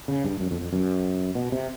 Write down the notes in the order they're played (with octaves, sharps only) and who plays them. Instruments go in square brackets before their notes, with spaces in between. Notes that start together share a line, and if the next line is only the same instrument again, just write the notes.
[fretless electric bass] C#3
G2
F#2
F2
F2
F#2
B2
C3